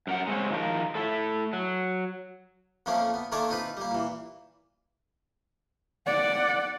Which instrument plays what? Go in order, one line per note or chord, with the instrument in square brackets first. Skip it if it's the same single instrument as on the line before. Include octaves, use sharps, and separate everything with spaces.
[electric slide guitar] F#2 A#4 F#5
G#3 C4 C#5
D#3 F3 A#4
A2 E4 A4
F#3
[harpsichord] F2 F3 A3 A#3 C#4 A#4
B3
D#3 A3 A#3 A4 C#5 D5
C4 D#4 F4 B4
G3 A#3
A#2 E3
[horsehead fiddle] D5 F#5